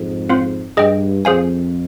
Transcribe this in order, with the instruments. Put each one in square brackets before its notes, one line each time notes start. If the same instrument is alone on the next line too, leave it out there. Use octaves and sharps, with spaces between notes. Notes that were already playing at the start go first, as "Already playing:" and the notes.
Already playing: [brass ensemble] F2 G#2
[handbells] C4 F4 C5 F5
[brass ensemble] G2 [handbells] G#4 D#5 G5
[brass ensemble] F2 [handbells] G#4 C5 F5 G#5